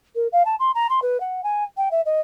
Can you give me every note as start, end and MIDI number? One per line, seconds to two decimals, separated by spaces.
0.15 0.27 70
0.32 0.45 77
0.45 0.55 81
0.59 0.71 84
0.75 0.87 82
0.89 1.00 84
1.02 1.20 71
1.20 1.41 78
1.44 1.64 80
1.77 1.89 79
1.91 2.01 76
2.06 2.21 75